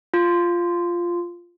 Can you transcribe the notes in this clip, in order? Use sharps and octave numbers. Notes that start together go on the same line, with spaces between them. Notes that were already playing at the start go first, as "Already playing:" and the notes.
F4